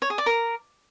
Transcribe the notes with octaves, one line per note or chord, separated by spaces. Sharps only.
C#5
G#4
D5
A#4